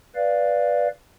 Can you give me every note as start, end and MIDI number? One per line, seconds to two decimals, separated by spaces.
0.15 0.88 71
0.15 0.88 74
0.15 0.88 77